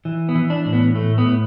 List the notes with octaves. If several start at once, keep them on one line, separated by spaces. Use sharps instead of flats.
E3
B3
E3
D4
A2
B3
A2 A3
B3
A2